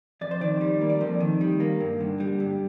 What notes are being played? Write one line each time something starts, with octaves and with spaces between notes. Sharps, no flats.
F2 D5
C5
D#3 D5
G3
A#3
D5
F2 C5
D#3
G3
A#3
G2
D3
G3
G2